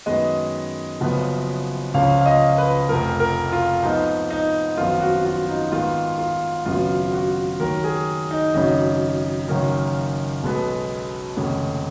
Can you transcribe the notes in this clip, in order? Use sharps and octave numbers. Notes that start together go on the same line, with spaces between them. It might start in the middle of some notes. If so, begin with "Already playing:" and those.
F#2 D#3 G#3 B3 D#5
F#1 F#2 F3 B3
C#2 C#3 F3 F5
F5
D#5
B4
F1 F2 F3 A#4
A#4
F4
G#2 F3 B3 D#4
D#4
G#1 F#2 F3 B3 F4
F#4
F4
D#4
G#2 D#3 G#3 B3 F4
F4
G#1 F#2 C#3 F#3 B3 F4
F#4
D#2 D#3 F#3 A#4
G#4
D#4
G#1 F#2 C#3 D#4
F#1 F#2 D#3 A#3 C#4
B1 B2 G#3 B3
F1 D#2 C#3 G#3